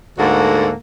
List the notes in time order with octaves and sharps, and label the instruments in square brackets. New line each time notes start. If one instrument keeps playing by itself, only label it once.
[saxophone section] D2 G#2 A#3 F#4 A4 F#5